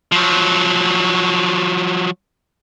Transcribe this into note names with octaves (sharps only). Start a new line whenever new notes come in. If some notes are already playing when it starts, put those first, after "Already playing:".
F3 F#3